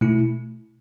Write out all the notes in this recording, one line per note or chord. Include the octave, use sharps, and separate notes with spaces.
B2 A3 E4